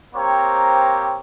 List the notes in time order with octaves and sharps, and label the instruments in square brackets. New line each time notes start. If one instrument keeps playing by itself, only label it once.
[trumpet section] A#3 C4 G4 C5 C#5 A#5